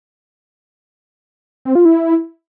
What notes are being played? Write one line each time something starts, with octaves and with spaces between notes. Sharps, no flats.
C4
F4
E4